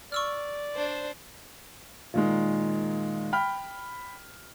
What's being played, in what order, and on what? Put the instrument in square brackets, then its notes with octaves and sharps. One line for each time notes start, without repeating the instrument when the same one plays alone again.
[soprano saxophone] D5 [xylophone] C#6 E6 F6
[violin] D4 C5
[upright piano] A#2 D#3 G#3
G5 B5 F6